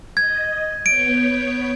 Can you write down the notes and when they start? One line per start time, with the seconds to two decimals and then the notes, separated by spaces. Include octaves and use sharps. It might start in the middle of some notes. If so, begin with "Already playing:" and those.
0.17 D#5 G#6
0.86 B3 C#5 G6 D7